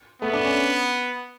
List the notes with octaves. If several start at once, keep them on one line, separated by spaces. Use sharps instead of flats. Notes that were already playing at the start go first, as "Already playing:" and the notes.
A3 B3
D4
C#4